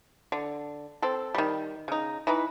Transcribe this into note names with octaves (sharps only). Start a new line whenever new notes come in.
D3
C4 A4
D#3 G3
C#3 D#4
E3 D#4 B4